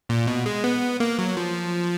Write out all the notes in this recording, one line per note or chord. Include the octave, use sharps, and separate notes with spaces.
A#2
B2
G#3
B3
A#3
F#3
F3